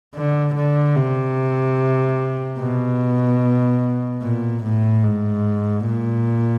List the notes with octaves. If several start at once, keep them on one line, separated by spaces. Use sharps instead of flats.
D3
D3
C3
B2
A#2
A2
G#2
A#2